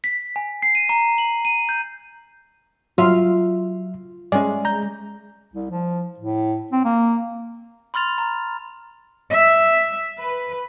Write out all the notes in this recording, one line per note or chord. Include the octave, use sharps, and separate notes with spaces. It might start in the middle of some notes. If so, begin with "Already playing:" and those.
B6
G#5
C7
D#7
A#5
F#7
D#7
G6
F#3 F4 E5
G#3 C#4 D5
A#5 G6
C2
F3
A2
C4
A#3
B5 C6 F6 A6 F7
A#5
E5
B4